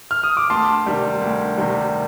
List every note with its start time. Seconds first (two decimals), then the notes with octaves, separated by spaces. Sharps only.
0.11 F6
0.24 D#6
0.37 D6
0.50 D2 A5 C6
0.86 C3 D#3 G3
1.21 D2
1.58 C3 D#3 G3